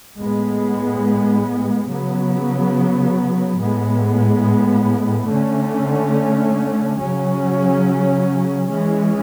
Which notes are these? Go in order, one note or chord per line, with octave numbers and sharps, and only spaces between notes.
A2 G#3 B3
C#3 F#3 B3
A2 G#3 B3
D3 A3 C#4
C#3 F#3 C#4
E3 G#3 C#4